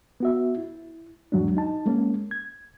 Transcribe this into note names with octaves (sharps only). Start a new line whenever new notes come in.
B3 F#4 E5
E4
E2 G#2 F#3 G#3 D4
D#4 A5
G#3 A#3 C#4
G#6